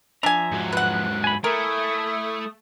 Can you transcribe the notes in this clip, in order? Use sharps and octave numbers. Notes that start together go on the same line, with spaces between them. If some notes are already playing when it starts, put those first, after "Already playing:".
F3 D4 E5 G#5 A#5
G#2 F#3
B4 F#5 F#6
G#5 B5
A3 E4 A#4 G#5 D#6